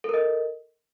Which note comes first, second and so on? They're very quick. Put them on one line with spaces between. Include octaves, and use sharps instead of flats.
A4 A#4 D#5